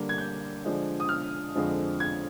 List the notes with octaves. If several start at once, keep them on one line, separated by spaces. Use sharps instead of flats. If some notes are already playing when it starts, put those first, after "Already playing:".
Already playing: D3 G3 A#3 D4
G#6
G6
D3 F3 G#3 D4
D#6
F6
F2 D3 F3 G#3
G#6